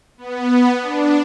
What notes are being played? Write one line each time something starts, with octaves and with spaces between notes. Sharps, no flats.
B3
D4